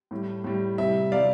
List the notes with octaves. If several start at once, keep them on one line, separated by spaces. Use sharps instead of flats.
A2 G3
A2 G3
C3 G3 E5
C3 G3 D5 F5